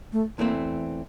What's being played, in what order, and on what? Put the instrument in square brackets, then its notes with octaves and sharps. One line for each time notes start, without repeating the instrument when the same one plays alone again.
[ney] A3
[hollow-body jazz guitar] E2 E3 A3 C4 [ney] A#3